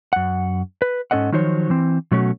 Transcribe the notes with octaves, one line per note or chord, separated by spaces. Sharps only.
F#2 F#5
B4
G#2 C#4 A4 D#5 F#5
D#3 F3 F#3 D#4 C5 C#5
E3 C4
B2 F#3 A3 C#4 F#4